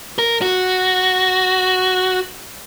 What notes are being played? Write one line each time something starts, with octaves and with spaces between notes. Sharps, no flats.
A#4
F#4